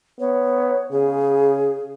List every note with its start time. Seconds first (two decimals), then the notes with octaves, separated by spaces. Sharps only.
0.20 B3 C#5
0.91 C#3 G#4